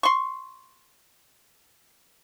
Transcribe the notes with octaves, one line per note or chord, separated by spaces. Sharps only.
C6 C#6